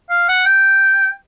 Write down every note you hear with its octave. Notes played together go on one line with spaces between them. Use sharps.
F5
F#5
G5